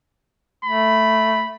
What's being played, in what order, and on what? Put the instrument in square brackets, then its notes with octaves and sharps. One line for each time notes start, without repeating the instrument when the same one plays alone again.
[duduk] A3 [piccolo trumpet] B5